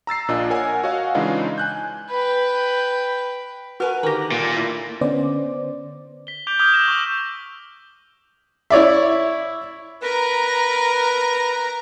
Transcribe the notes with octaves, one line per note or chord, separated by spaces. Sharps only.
A#5 E6 A6 C7
A#1 A#2 D4 F4 D#5
A#4 C#5 F#5 G#5
F#4 C#5 D#5 F5 F#5 G#5
C#3 E3 G#3 D4 D#4 F4
G#5 F#6 G6
B4 G5
F#4 A#4 B4 G#5
D3 D#3 G4 A#4 A#6
A#2
E4
D3 B3 C#4 C5 D5
B6 G7
D6 G6 B6 D7 F7 G7
D6 D#6 F6 G6 G7
E6 G6 A#6 E7
C#6 E6
E4 C#5 D5 E5
A#4 B4 A#5